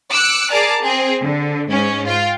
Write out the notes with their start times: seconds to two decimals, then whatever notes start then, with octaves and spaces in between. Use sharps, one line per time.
0.11 D6 E6 F#6 C#7
0.51 G#4 A#4 D5 A5 A#5 D6
0.82 C4 G#4
1.21 D3
1.70 G#2 C#4
2.07 F4 G5